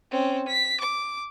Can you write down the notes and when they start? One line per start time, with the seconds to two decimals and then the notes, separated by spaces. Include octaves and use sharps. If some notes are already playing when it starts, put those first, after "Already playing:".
0.11 C4 C#4
0.48 B6
0.81 D6